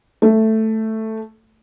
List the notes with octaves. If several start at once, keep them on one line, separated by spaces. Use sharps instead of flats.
A3